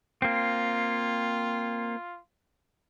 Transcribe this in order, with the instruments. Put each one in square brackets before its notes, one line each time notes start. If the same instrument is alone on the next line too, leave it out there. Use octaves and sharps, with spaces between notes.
[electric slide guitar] A#3 C4 [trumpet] F4